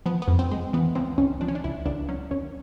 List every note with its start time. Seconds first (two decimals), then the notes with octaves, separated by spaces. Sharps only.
0.06 F3 B3
0.22 B3
0.28 F2
0.39 C4
0.51 G#3
0.73 E3 B3
0.95 C#2 C4
1.18 C#2 C#4
1.41 F3 D4
1.48 C#4
1.55 D4
1.64 C#2 E4
1.86 C#2 D4
2.09 F#3 C#4
2.31 D#2 C#4